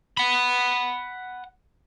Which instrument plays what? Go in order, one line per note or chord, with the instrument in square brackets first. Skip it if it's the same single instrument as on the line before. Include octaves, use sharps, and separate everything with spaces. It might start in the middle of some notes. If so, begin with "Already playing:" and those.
[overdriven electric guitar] F#5 B5